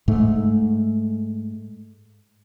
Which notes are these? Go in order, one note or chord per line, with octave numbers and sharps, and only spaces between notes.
G#2 A3